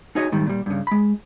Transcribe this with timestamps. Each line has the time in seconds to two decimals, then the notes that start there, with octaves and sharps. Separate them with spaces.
0.15 D#4 F#4 G#4 C#5 D#5
0.32 G#2 D#3 G3
0.46 A#2 G3
0.66 G2 C#3
0.87 G#3 B5